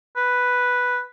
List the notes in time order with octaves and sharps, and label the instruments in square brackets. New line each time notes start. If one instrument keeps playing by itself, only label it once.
[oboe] B4